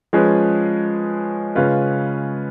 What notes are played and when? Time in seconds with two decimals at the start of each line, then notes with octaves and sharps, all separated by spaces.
0.13 F3 G#3 C#4 G#4 B4
1.55 C#3 G#3 C#4 F4 B4